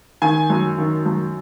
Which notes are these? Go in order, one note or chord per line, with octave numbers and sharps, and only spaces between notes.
D#3 G#5
F#2
D#3
F#2